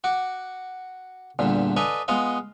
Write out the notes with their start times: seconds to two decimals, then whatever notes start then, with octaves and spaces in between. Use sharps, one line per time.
0.04 F#4 F#5 D6
1.39 E2 G2 A#2 D3
1.76 A4 B4 D5 D#5 F5 G#5
2.08 G#3 B3 F4 D#5 F5 F#5